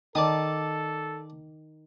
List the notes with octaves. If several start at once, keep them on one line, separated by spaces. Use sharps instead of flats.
D#3 A4 D5 A5 D#6